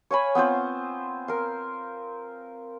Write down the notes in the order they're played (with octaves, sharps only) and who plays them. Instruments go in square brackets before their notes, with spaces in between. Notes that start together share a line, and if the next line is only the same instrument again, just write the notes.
[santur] C#5 F5 G#5 B5
B3 C4 F4 C5
A#4 F5